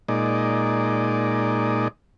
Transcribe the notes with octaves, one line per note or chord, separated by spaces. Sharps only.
A#2 G#3 D#4 D5